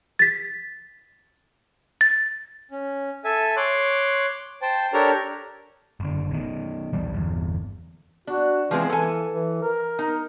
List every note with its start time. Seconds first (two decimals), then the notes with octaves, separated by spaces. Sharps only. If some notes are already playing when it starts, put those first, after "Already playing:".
0.19 A6 B6
2.01 A6
2.71 C#4
3.24 A4 E5 G#5
3.57 C#5 C6 D6 F#6
4.62 C5 G5 A5
4.93 D4 G4 A4 A#4 C#5 A#5
6.00 F#1 D3
6.31 B2 D#3
6.93 B1 E2 G3
7.14 G1 E2
8.27 D4 F#4
8.71 E3 F3 G#3 C4
8.90 E3 A4 G#5
9.32 E3
9.62 A#4
9.99 D#4